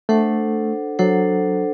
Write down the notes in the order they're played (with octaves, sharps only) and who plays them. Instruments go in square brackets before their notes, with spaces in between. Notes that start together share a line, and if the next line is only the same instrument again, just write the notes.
[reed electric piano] A3 [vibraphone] D4 A4 C5 F#5
[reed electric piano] F#3 [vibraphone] D4 A4 C5 F#5